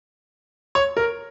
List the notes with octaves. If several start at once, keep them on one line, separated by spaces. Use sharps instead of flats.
C#5
A#4